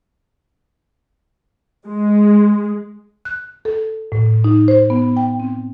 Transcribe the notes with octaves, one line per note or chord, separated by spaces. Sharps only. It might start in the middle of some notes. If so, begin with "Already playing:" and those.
G#3
F#6
A4
A2
D#4
C5
B3
G5
C4